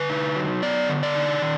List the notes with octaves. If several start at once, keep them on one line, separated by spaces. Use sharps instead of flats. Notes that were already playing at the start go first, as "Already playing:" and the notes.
Already playing: D3 B4
D#4
F#3
B3 D5
D3
D5
D#4
D#3